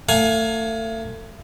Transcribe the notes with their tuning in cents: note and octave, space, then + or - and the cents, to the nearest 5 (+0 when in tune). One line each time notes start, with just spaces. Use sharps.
A3 +35 F5 +25 G#5 +15